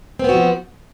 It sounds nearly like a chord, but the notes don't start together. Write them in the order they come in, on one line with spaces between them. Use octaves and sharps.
C4 B3 F#4 F3